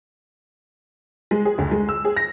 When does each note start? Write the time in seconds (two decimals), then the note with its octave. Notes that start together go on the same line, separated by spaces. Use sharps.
1.31 G#3
1.45 G#4
1.58 D2
1.71 G#3
1.89 E6
2.05 G#4
2.17 A#6